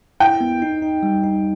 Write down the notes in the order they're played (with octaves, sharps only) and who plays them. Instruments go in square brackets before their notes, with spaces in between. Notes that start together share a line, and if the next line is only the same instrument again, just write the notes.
[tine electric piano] E4 [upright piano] G5
[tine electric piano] B3
D#4
D#4
G3
D#4